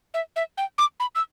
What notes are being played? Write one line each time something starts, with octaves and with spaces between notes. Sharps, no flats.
E5
E5
G5
D6
B5
E6